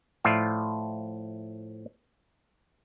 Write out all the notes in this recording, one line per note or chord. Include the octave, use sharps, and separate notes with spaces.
A2 F3 F4 D5 E5